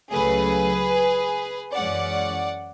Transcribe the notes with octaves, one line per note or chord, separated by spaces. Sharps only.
C#2 C#3 F#3 A3 G#4 B4
F#2 E3 G#3 C#4 D5 F#5